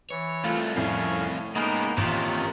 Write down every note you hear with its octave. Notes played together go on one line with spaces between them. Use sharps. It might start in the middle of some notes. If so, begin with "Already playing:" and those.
E3 C#5
C2 A3 F4
F2 A2 C#4 F5 G#6
C#3 G#3 A#3 B3 D#4 A#4
A1 C3 D#3 C#4 F4